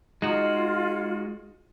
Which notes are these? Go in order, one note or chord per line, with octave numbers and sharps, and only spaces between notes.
G#3 D#4 F4 F#4